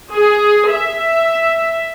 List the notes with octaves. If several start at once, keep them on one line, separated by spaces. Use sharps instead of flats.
G#4
E5